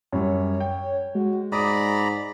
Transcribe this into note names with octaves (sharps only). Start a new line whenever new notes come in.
F#2 G3 C#5
G5
G#3 F#4
G#2 D5 A#5 B5 D6 D#6